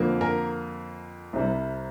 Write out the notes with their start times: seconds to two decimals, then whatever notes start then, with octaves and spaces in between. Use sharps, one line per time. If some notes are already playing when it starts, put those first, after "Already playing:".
Already playing: F2 D3 F3 A#3
0.21 A#4
1.33 C2 C3 G3